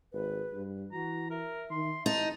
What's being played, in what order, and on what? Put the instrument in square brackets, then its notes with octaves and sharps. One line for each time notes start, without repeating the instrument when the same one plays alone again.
[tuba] G#1 [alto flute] B4
[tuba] G2
[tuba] E3 [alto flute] F#4 [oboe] A#5
[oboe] A#4 [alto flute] E5
[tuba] D#3 [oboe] C6
[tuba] A1 [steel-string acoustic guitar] D#4 [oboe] A5